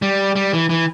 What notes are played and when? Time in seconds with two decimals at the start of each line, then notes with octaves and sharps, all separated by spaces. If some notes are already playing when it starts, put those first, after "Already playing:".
0.02 G3
0.36 G3
0.53 E3
0.69 E3